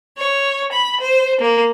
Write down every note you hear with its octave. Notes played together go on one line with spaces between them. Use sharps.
C#5
B5
C5
A#3